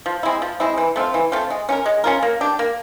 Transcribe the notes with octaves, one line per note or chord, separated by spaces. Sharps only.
F3
G#3 C4 E4
F3
G#3 C4 E4
E3
A3 C4 F4
E3
A3 C4 F4
G#3
C#4 F4 A#4
G#3
C#4 F4 A#4
A#3
D4 G4
A#3